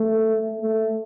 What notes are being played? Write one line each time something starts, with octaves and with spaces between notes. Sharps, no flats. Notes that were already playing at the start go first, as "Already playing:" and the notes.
Already playing: A3
A3